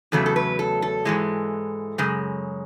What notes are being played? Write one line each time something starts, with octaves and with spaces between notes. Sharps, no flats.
E2 C#3 F#3 A3 A4
A4
B4
A4
A4
G#2 E3 G#3
F#2 C#3 G#3